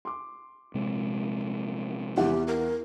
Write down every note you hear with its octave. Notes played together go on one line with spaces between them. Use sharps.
C6 D6
A#1 C3 G#3
E2 E3 G4 F#5
A#4